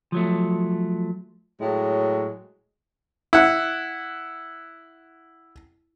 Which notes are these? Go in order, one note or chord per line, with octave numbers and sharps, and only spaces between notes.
F3 F#3 A3
A2 F#3 G#3
E4 F#5